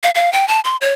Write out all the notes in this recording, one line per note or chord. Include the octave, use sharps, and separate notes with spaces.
F5
F5
G5
A5
C6
C#5